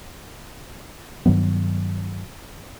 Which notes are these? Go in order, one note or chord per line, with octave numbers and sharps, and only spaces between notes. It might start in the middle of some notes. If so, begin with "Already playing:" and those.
G2 D#3 F#3 B3